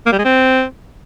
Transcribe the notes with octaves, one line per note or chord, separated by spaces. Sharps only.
A#3
G3
G#3
C4